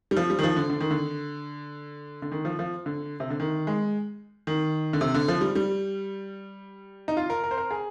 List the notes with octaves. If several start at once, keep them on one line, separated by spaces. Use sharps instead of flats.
G3
F3
G3
D#3
F3
D3
D3
D#3
D3
D3
D#3
F3
F3
D3
C3
D3
D#3
G#3
D#3
D3
C3
D3
F3
G3
G3
D#4
F4
A#4
A#4
C5
A#4
G#4